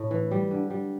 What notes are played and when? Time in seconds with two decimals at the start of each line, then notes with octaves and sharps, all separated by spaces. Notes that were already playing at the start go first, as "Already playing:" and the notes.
Already playing: A2
0.11 E3
0.31 G3
0.51 D3
0.70 G3